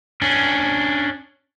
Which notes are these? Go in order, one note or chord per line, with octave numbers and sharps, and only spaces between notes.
C#4 D4